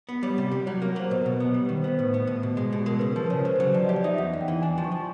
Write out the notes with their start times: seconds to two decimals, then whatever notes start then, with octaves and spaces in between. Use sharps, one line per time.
0.09 B3
0.23 G3 C#5
0.38 C3
0.52 G3
0.66 F#3 C#5
0.82 A#3
0.89 C#5
0.96 F#3 C5
1.11 B2 B4
1.26 B2
1.40 B3
1.54 G3
1.65 D#3 B4
1.77 C5
1.84 B3 B4
1.98 A2 C5
2.14 B3
2.27 A2
2.43 B2
2.57 G#3
2.73 B2
2.86 G#3 A#4
2.99 C#3 B4
3.13 F3 A#4
3.30 C#3 C#5
3.39 C5
3.45 C#3 B4
3.56 F#3 C5
3.74 F3 D5
3.85 G4 D#5
3.96 D5
4.04 D#4 E5
4.18 E2 F#5
4.33 E2
4.41 G5
4.48 E3
4.62 D4 G#5
4.78 F3
4.84 C#6
4.92 F3